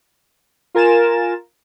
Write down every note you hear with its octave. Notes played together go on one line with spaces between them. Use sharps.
F4 A#4 G#5 A6 E7